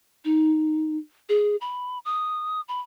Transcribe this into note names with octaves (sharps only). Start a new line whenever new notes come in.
D#4
G#4
B5
D#6
B5